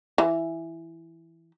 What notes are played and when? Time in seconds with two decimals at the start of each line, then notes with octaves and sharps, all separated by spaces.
0.18 E3